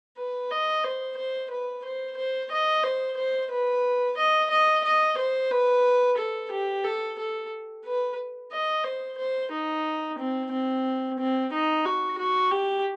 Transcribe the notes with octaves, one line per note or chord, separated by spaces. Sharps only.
B4
D#5
C5
C5
B4
C5
C5
D#5
C5
C5
B4
D#5
D#5
D#5
C5
B4
A4
G4
A4
A4
B4
D#5
C5
C5
D#4
C4
C4
C4
D#4
F#4
F#4
G4